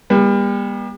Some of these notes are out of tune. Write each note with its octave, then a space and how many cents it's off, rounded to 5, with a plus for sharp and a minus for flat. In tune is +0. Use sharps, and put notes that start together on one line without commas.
G3 +35 B3 -45